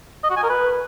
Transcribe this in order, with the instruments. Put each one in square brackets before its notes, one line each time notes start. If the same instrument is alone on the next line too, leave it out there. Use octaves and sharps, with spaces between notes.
[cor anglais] D#5
F#4
G#5
A#4
B4